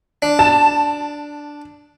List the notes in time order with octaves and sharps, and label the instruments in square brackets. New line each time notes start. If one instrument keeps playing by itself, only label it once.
[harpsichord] D4
[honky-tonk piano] A5